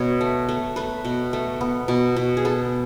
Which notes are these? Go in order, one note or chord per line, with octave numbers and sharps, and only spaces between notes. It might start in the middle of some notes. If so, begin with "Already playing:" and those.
Already playing: B2 C#5
A3
A3
A3 B4
B2
A3
B3
B2
B2
G#4
B3 A4